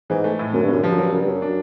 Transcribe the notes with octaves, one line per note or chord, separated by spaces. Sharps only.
G#2 E3
A3
A2
F#2 D3
G2
F#2 D3
G2 F3
F#2
G2 F#3
F#2 C#3
G2
F#2 F#3
D4